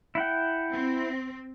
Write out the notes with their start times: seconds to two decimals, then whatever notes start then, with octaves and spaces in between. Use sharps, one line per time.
0.15 E4 F#5 G5
0.72 C4